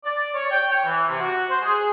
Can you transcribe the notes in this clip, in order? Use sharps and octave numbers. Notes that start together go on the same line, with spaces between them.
D5
C#5
G5
C#5
E3
C3
F#4
C5
G#4